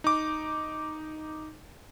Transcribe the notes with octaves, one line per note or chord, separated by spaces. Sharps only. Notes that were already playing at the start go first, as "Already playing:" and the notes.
D#4 D6